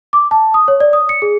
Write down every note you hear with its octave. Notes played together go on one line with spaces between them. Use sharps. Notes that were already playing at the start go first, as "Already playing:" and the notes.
D6
A5
D#6
C#5
D5
D#6
C#7
G#4